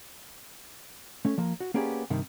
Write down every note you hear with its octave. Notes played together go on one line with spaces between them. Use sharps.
A3 C#4
F3 A#3
F#4
A#3 B3 C#4 G4 G#4 D5
G2 C3 D#3